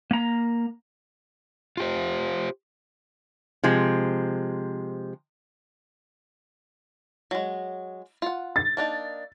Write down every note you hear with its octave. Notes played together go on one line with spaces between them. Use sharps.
A#3 A#5
F4 G4 C5
C3 F3 G#3
F#3 G#3
F4 F#5
A6
A#3 D4 D#4